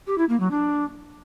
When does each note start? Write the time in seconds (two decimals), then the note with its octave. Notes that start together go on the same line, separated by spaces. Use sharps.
0.07 G4
0.18 E4
0.29 A#3
0.40 F#3
0.51 D4